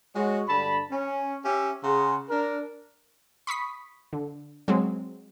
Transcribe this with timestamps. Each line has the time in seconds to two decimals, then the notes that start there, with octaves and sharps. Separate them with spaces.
0.16 G#3 F#4 C#5
0.48 G2 D3 A5 B5
0.91 C#4
1.45 C#4 G4 E5
1.84 C#3 G#4 F#5 A#5 C6
2.29 D4 A#4
3.47 B5 C#6 D#6 B6
4.13 D3
4.68 F#3 G#3 C4